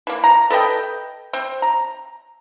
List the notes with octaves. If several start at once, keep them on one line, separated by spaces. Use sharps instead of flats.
E3 A#3
A#5
A4 B4 D#5 G5
C4
A#5